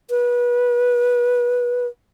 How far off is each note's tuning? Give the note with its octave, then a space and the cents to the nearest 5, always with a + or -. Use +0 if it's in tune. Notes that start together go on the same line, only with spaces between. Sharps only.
B4 -25